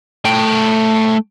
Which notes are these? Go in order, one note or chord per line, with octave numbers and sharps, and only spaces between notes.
A3 G5